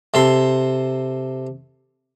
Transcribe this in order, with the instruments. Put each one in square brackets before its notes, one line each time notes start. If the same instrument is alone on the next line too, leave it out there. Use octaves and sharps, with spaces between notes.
[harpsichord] C3 A4 C6